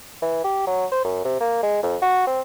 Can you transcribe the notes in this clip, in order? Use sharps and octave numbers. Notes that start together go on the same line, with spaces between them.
E3
G4
F#3
C5
F#2
C3
A#3
G#3
F2
F#4
C4